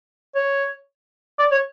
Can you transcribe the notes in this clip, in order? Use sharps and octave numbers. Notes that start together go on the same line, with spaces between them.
C#5
D5
C#5